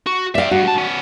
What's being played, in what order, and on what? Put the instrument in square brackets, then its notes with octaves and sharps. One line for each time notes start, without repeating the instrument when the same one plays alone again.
[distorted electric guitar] F#4
[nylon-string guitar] D5 F5 [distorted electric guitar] E5 G5
[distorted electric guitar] G2 [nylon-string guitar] F#4
[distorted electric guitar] G2 A5
B3 C#4